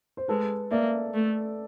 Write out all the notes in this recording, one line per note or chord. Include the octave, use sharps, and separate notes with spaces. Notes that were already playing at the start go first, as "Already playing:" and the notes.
C5
G#3 A4 B4
A#3 D5 E5
A3